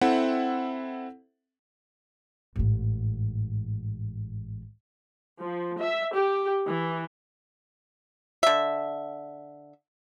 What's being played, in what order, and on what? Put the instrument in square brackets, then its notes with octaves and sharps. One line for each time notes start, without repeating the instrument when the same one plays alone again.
[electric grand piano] C4 E4 A4 E5 F#5
[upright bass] A1 G#2
[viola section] F3
E5
G4
E3
[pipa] D3 E5